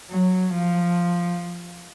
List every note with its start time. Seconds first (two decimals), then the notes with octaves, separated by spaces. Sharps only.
0.10 F#3
0.55 F3